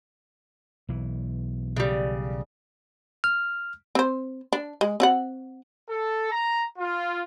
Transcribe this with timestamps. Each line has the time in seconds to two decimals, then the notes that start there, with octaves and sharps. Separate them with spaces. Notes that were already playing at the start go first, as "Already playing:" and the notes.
0.89 B1 E3
1.77 C#3 G3
3.24 F6
3.95 C4 C5
4.53 D4
4.81 G#3
5.00 C4 F#4 F#5
5.89 A4
6.31 A#5
6.78 F4